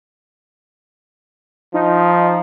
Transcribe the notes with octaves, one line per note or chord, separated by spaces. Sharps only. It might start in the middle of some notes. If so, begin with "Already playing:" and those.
F3 D#4